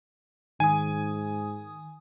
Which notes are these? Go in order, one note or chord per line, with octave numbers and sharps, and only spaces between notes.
G#2 D#3 G#5 D#6